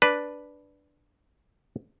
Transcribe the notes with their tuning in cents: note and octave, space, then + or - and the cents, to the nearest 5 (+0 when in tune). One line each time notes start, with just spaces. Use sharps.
D4 +0 B4 +0